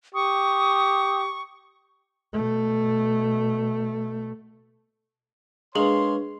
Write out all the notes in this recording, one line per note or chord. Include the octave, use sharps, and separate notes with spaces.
G4 C#6 D#6
B2 A3
G#3 A#3 D4 G#4 B4 C#5 C6 F#7